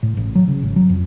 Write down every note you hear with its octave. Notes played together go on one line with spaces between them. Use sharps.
A2
A1
F#3
C#3
G#1
F#3
F2